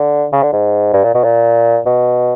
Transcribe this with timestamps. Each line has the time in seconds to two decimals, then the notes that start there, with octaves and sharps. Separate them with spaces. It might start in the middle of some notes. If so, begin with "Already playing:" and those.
Already playing: D3
0.33 C#3
0.43 D3
0.53 G#2
0.93 G2
1.04 A#2
1.14 B2
1.24 A#2
1.86 B2